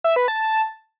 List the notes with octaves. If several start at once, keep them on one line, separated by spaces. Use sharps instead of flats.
E5
B4
A5